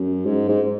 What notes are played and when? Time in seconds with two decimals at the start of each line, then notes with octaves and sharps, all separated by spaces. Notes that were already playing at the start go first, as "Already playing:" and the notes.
Already playing: F#2
0.26 G#2
0.49 G#2